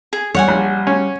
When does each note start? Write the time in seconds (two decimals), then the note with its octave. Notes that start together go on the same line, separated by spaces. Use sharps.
0.13 G#4
0.34 G3 C#5 F#5 G#5
0.48 A#1
0.87 C#4